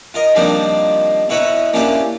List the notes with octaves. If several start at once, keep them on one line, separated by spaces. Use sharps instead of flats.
F4 A#4 D#5
D#3 F3 G3 A#3 C4 D4
B2 E4 B4 C#5 E5 A#5
A#3 C#4 D4 E4 F4 G4